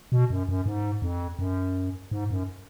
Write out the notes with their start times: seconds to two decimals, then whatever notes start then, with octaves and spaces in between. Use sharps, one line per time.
0.12 B2
0.30 F#2
0.49 F#2
0.66 G#2
1.02 F2
1.39 F#2
2.11 G#2
2.31 F#2